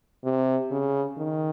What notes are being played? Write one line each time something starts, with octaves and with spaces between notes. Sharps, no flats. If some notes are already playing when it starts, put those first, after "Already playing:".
C3
C#3
D#3